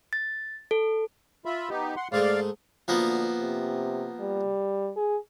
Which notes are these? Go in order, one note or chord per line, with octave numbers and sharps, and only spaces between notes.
A6
A4
F4 E5 B5
B3 D#4 G4
F#5 C6
G#2 G#3 A3 D5 F5
D2 F3 A#3 B3
C3
G3
G#4